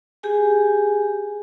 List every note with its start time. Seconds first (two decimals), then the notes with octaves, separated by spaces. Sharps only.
0.23 G4 G#4 G#5